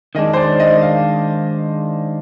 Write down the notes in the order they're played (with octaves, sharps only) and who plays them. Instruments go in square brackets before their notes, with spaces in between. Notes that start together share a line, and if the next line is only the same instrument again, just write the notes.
[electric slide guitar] D#3 G#3 D4 [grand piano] D#5
[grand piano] C5
D5
D#5
F5